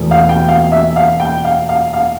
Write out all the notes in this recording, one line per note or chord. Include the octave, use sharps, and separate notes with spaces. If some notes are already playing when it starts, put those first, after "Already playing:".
Already playing: E2 B2 A3
F5
G5
F5
E5
F5
G5
F5
F5
F5